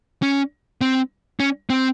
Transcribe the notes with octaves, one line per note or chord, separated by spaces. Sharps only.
C#4
C4
C#4
C4